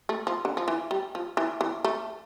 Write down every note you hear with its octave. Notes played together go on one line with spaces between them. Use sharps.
A3
F3
D3
F3
E3
G3
F3
E3
E3
A3